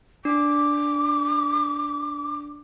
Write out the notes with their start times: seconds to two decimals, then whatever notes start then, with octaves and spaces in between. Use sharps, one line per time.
0.25 D4 D6